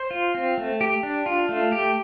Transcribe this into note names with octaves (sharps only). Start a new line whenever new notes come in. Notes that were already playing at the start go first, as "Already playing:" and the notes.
Already playing: C5
F4
C4
A3
G4
D4
F4
A3
G4